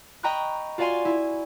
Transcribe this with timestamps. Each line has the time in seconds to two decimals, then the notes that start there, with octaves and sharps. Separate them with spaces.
0.23 D#5 G5 A#5 B5 C#6 F#6
0.78 F4 F#4 D5 F5 G#5 C6
1.05 E4